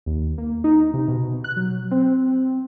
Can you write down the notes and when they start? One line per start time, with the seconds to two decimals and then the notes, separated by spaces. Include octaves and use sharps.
0.06 D#2
0.38 A#3
0.64 D#4
0.94 C3
1.08 B2
1.44 F#6
1.56 F#3
1.91 C4